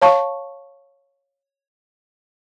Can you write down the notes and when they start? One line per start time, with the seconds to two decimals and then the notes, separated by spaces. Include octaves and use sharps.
0.02 C#5 F5 A5 C#6